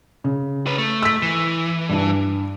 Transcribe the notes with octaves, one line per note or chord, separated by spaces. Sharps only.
C#3
C#4 B4
A3
E6 B6
E3
G2 D4